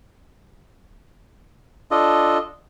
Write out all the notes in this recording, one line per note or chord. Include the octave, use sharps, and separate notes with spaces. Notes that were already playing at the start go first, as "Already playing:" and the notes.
D4 F4 A4 D#5